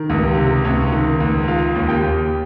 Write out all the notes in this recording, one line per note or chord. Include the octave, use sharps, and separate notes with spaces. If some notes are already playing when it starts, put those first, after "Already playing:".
Already playing: D#3
C#2
G4
C3
C#2 C#4 C#5
D#3
C#2
C#3 F4 F5
D#2
G4 G5
D#2